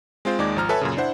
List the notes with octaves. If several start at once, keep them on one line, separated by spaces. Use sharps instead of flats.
G#3 C4 F4 C5
D#2 G#3 D#4 D5 D6 G#6
G#1 F3 A#5 F6
A4 B4 C#5 E5 G#5 A5
F#2 A#2 C#3
D4 E4 C5 F#5